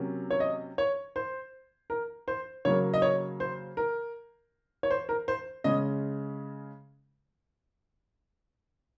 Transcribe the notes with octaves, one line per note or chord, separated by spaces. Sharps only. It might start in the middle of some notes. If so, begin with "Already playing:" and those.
Already playing: C3 F#3 A#3 C#4
C#5
D#5
C#5
C5
A#4
C5
C#3 F#3 A#3 C#5
D#5
C#5
C5
A#4
C#5
C5
A#4
C5
C#3 G#3 C#4 D#5